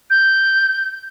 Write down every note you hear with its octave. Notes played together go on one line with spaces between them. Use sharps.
G6